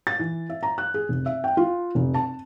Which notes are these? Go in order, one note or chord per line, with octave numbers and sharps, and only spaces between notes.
A6
E3
E5
A#5
F#6
G#4
F1
E5
G5
F4
F1
A5